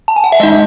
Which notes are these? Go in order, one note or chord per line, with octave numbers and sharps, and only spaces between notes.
A5
G#5
F#5
E5
G#3 D#4 D#5